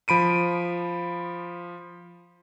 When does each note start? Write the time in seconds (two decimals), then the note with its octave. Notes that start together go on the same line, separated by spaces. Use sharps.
0.08 F3 B5 D7 D#7